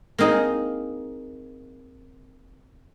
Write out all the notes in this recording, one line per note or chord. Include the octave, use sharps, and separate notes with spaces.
A#3 C4 D#4 G#4